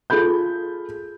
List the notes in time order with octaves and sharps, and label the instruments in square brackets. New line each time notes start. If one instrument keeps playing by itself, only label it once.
[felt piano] F4 G#4 A4 B5 G6